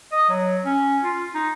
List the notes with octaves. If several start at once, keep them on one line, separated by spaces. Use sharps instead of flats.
D#5
F#3
C#4
F4
D#4